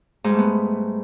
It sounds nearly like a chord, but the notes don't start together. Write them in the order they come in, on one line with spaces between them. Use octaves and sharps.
G#2 G3 A3 B3